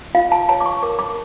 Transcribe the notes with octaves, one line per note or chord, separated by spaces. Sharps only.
F4 F5
A5
C#5 A5
D6
C#6
A#4 D6
D6